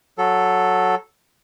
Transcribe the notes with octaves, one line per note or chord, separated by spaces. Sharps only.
F#3 A4